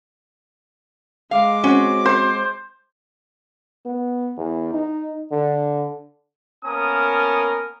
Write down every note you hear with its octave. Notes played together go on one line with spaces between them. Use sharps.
G#3 F5 D6
C4 C#4 F#4
C5
B3
E2
D#4
D3
A#3 B3 C#4 A#4 A5 D#6